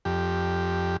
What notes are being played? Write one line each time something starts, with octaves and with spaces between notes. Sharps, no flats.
F2 G4